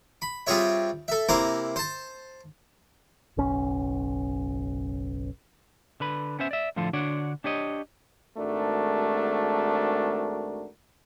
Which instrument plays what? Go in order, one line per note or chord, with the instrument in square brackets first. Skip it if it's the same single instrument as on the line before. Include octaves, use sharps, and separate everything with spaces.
[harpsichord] B5
G3 C4 F4 G#4 C#5 E5
A4 E5
C3 A#3 E4 C5 A#5
C5 A5
[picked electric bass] F#1 B1 C#4
[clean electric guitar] D3 B4 B5
B3 C#4 C5 E5
D5 E5
A2 D3 F3 F4 A4
D3 D4 F#4 C#5 D5
D4 G4 C#5 D#5
[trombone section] G#1 G#2 A3 D4 F#4 A#4